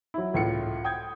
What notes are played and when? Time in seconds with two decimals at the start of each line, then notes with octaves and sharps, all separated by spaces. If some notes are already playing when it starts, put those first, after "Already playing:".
0.14 F#3 E4
0.34 C#2 A2 F4 C#7
0.84 G5 D#6 G6 G#6